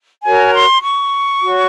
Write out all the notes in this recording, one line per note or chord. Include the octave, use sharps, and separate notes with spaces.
F#4 A#4 C#5 G#5
C6
C#6
F#4 C#5